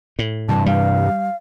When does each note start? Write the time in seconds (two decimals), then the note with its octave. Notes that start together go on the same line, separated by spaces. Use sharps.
0.19 A2
0.49 G2 C3 E3 A5
0.66 G3 F5